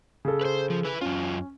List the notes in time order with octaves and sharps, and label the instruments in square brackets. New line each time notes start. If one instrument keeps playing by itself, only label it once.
[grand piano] C#3 A4
[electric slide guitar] B4 C5
F3
E4 B4
[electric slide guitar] F#2 F4 [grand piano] C#4